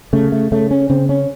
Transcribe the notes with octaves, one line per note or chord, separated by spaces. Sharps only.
C#3 A3
A3
C#3 A3
C#4
C#3 C4
C#4